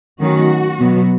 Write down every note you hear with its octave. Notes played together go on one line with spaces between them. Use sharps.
D#3 F#3 A3 C#4 F#4
B2 F#3 B3